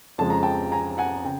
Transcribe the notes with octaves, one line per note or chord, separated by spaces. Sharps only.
F2 C#3 F3 G#3 A5
A#5
G5 A5
G#5 A#5
F#5 G#5
C#3 G5